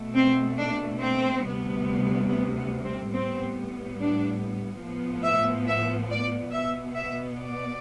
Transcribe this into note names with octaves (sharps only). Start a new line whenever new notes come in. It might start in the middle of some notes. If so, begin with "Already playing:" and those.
Already playing: B2 A3
C4
D4
C4
D2 C3 G3 B3
B3
B3
C4
A2 G3 B3 C4
D4
A2 F3 B3
E5
E5
D5
B2 B3 E5
E5
D5